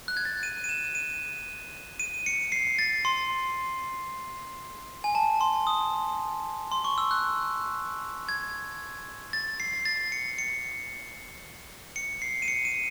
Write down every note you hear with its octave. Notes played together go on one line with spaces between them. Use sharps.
F#6
G#6
A6
D#7
D#7
E7
D#7
D#7
C#7
C7
A6
C6
G#5
A5
C6
D#6
C6
C#6
E6
F#6
G#6
A6
C7
A6
C#7
C#7
C#7
C7
D#7
C#7
D#7